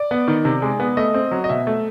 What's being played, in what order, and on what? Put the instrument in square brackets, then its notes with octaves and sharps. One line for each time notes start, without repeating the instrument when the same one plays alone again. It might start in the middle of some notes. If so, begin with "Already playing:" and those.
Already playing: [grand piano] D5
B3
D#3
C3
G#3
B3
A3 D#5
C4
F#3
D#5
B2 E5
A3